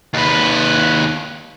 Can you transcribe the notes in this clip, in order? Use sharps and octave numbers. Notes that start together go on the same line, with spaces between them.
D#2 B4